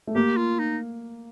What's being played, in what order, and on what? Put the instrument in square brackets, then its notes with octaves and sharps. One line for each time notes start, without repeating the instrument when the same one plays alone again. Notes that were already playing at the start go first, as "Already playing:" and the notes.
[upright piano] A3
[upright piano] A#3 [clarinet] G4
[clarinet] F4
D#4